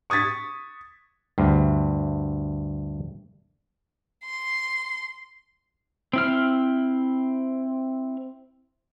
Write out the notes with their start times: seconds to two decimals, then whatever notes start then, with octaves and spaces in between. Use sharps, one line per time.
0.10 C#6 D#6 G#6 A6 B6
1.38 D2 G2
4.26 C6
6.13 C4 E4 F6